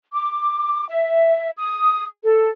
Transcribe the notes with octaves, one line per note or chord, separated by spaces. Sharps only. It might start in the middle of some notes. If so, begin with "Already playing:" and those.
D6
E5
D#6
A4